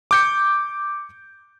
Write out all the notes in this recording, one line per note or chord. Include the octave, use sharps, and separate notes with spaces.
D6 G6 C#7